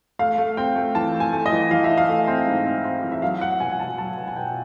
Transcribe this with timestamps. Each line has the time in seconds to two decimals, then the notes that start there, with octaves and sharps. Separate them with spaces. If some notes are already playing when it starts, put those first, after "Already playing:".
0.19 A3 F5
0.38 A3
0.57 C4 G5
0.76 A3
0.95 E3 A5
1.14 A3
1.20 G#5
1.33 A3
1.46 D#5
1.52 E3
1.71 E3 F5
1.84 E5
1.90 E3
1.97 F5
2.09 A3
2.27 C4
2.47 G#2
2.66 C4
2.84 C4
3.03 E3
3.12 E5
3.22 F#3 F5
3.41 F#3 F#5
3.60 B2 G#5
3.71 G#5
3.79 B2 A5
3.98 F#3 A5
4.17 B2
4.28 G#5
4.36 B2 G5